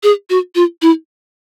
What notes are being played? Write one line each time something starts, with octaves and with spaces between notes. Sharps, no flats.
G#4
F#4
F4
E4